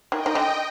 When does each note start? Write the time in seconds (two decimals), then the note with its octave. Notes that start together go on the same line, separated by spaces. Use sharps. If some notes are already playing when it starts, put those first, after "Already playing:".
0.12 D#3 D#5 G5
0.26 D#3
0.35 D3